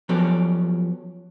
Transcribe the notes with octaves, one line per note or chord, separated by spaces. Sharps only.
F3 F#3 B3 C#4 G4 A4